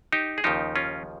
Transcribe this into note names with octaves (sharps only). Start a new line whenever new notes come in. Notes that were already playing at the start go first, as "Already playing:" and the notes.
D#4 G4
G#4
D#2 C#3 F3 D#4 G4
C#4 F4